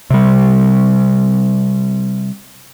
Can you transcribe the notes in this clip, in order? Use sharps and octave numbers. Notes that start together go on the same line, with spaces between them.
C3 G3